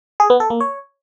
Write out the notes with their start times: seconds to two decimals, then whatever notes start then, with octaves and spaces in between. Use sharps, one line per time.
0.20 G#4
0.30 B3
0.40 A4
0.50 A#3
0.60 C#5